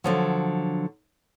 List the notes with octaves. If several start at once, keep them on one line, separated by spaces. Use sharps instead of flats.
D3 F3 F#3